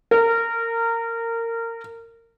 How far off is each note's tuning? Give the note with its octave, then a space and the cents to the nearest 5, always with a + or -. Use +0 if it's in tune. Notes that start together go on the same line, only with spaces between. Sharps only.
A#4 -25